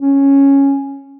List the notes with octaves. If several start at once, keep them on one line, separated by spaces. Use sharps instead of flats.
C#4